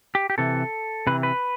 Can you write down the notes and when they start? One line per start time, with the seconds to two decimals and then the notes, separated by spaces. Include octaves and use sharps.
0.15 G4
0.30 G4
0.38 C3 E3 A4
1.07 C3 E3 B4
1.23 B4